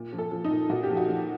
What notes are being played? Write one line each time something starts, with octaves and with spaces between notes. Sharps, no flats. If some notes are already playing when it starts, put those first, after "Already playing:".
Already playing: A#2
F3
A4
F3
D#4
A#2
A#2 F#4
G4
F3
F#4
F3